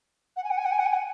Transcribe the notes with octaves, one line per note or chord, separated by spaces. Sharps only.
F#5
G#5
F#5
G#5
F#5
G#5
F#5
G#5
F#5